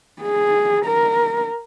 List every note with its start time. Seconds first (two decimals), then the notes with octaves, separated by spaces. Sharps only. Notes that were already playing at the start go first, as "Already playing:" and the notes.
0.22 G#4
0.85 A#4